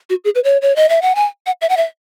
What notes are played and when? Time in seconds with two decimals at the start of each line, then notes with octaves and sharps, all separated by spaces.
0.10 F#4
0.24 G#4
0.35 B4
0.44 C#5
0.62 C#5
0.76 D#5
0.89 E5
1.02 F#5
1.15 G#5
1.46 F#5
1.61 E5
1.69 F#5
1.77 E5